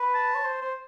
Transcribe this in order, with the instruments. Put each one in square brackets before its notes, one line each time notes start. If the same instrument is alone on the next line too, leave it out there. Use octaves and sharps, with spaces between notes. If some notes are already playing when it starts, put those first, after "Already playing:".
Already playing: [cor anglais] B4
[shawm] A5
[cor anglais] C#5
C5
C5